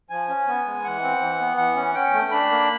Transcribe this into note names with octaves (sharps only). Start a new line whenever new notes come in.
F3 G#5
C#4
B3
G#3
E3 F#5
C4
E3
B3
E3 F#5
C#4
C#4 G5
A3
D4 B5
A#3